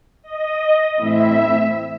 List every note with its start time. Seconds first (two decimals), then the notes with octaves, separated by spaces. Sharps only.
0.23 D#5
0.99 A2 E3 A3 C4 E4 E5